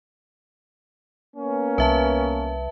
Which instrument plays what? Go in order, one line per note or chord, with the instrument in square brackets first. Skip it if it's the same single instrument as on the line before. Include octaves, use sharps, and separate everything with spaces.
[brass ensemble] A#3 B3 C#4
[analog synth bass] C2 [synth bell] B4 E5 A5